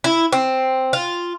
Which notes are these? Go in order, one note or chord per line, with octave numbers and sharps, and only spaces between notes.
E4
C4
F4